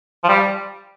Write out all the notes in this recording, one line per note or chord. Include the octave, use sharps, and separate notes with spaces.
F3
G3